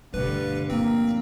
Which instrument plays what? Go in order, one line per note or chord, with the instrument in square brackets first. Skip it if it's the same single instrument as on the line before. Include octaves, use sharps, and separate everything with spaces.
[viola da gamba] G2 D3 [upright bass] B2 A3 [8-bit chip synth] B4
[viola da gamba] A#2 [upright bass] F3 A3 [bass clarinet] A#3 [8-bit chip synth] C4